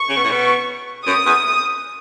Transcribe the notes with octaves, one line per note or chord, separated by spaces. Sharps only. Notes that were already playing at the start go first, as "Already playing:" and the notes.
Already playing: C#6
C#3
B2
A2
B2
F#2 D#6
E2